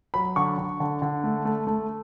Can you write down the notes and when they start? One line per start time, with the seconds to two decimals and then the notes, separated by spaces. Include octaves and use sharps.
0.14 F#3 B5
0.36 D3 C#6
0.58 D3
0.80 D3
1.02 D3
1.24 A3
1.45 A3
1.67 A3